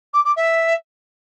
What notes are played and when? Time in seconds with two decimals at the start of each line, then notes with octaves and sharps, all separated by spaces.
0.13 D6
0.24 D6
0.36 E5